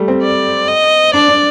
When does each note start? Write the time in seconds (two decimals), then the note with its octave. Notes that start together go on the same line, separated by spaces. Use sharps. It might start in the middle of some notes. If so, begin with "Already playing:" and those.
Already playing: G3 A3
0.08 C4
0.23 D5
0.68 D#5
1.14 D4 D5
1.29 D4